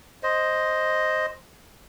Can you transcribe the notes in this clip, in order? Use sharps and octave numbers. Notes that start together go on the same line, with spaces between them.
C5 D#5